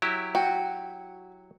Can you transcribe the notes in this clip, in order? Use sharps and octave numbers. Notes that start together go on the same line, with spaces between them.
F#3 E4 G4
F#4 G5